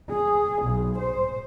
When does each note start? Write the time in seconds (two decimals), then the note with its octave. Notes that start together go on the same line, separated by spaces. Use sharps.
0.12 G#4
0.65 B1
0.98 C5